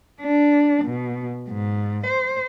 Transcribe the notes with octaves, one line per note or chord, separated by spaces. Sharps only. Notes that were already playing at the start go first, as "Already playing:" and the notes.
D4
B2
G#2
C5